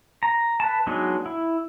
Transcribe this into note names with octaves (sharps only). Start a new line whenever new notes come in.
A#5
B4 A5
F#3 G#3 B3 D4 D#4
E4